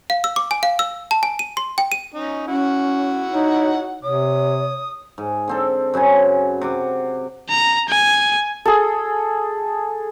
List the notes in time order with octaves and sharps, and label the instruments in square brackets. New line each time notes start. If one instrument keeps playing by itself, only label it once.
[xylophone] F5
E6
D6
G#5
F5
E6
A5
G#5
D#7
C6
G5
D#7
[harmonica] C#4 D#4
[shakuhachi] C#4 [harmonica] E4 F#4 F#5
[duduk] D#4 [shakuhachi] C#5
[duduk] C3 [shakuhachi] C#5 [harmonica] D#6
[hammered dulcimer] G#2
D3 C4 A4
F#2 C#3 C5 G#5
C3 F#5 D6
[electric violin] A#5
G#5
[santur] G#4 A4